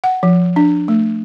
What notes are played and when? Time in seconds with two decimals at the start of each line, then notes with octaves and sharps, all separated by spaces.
0.04 F#5
0.23 F3
0.56 D4
0.88 A3